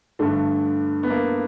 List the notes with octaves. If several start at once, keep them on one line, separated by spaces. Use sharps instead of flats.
G2 D3 A3
B3
A#3